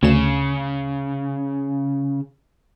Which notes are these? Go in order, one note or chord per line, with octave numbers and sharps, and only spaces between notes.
D2 C#3 E7